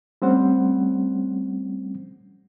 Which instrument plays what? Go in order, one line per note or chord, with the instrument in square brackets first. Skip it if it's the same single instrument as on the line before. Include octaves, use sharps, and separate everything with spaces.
[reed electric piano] G3 A3 C4 C#4 C5 F#5